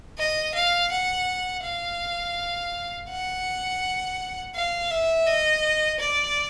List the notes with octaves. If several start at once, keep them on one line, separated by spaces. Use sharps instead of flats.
D#5
F5
F#5
F5
F#5
F5
E5
D#5
D5